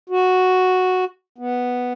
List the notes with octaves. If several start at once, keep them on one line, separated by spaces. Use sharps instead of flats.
F#4
B3